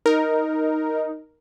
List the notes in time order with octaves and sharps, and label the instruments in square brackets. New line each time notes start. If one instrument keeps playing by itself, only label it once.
[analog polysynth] D#4 [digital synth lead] A#4